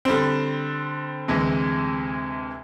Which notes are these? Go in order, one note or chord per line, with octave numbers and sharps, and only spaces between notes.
D3 G3 C4
D2 C3 E3 G#3